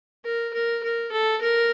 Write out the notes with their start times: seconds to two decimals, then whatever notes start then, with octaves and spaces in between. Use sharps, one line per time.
0.25 A#4
0.54 A#4
0.83 A#4
1.12 A4
1.41 A#4